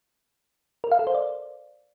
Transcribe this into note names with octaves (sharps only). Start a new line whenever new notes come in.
A#4
F5
A4
C5
D5